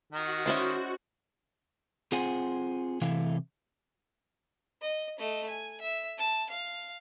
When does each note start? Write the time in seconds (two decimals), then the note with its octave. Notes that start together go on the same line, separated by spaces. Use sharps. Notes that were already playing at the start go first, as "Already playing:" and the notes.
0.12 D#3 F#4
0.46 G#3 C#4 E4 C5 D5 D#5
2.12 C4 F4 G#4 C5 F#5 G#5
3.01 C3 E3 A3 E4 F5
4.81 D#5
5.18 A3 D#5
5.49 G#5
5.81 E5
6.18 A5
6.49 F5